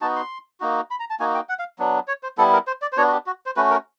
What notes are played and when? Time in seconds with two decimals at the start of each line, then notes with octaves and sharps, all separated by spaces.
0.01 B3 D#4 F#4 A5
0.16 C6
0.60 A#3 D#4 F#4
0.91 B5
1.00 A#5
1.10 A5
1.20 A#3 D#4 F#4 G#5
1.34 G5
1.49 F#5
1.59 F5
1.79 F#3 B3 D4
2.08 C#5
2.23 C5
2.38 G3 B3 E4 A4
2.53 A#4
2.67 C5
2.82 D5
2.93 C5
2.97 B3 D4 F#4 C#5
3.07 F#4
3.12 G4
3.26 F#4
3.46 C5
3.56 A3 C#4 F#4 B4
3.70 A#4